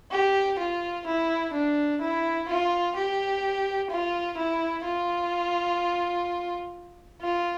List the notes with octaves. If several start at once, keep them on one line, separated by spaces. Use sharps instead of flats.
G4
F4
E4
D4
E4
F4
G4
F4
E4
F4
F4